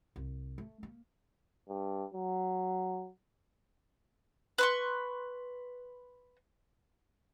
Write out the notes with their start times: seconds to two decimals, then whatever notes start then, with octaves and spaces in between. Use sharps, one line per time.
0.16 C2
0.58 A3
0.83 A#3
1.69 G2
2.14 F#3
4.58 B4 C6 C#6